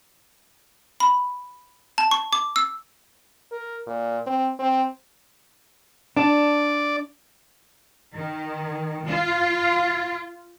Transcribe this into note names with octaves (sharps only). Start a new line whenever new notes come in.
B5
A5
C#6
D6
E6
A#4
A#2
C4
C4
D4 D5
D#3
F4